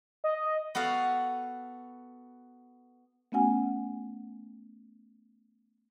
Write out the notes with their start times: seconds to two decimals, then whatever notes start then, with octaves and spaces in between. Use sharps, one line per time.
0.24 D#5
0.75 B3 F#4 A4 F5
3.32 A3 B3 C#4 F#4 F#5 G#5